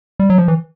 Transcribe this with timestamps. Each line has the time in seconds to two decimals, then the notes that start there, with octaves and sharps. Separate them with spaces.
0.19 G3
0.30 F#3
0.38 F3
0.48 E3